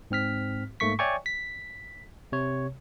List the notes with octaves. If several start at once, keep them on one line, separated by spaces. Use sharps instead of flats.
G#2 C4 F6 B6
G#2 A3 A#3 C#6 B6
C#5 D5 E5 G5 G#5 C#6
B6
C3 C#5